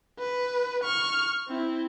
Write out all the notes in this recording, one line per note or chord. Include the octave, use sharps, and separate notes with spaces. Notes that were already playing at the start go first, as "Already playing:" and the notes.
B4
C#6 F6
C4 E4